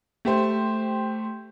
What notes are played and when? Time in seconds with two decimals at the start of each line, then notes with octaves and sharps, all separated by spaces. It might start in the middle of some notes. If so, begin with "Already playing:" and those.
0.25 A3 G4 C5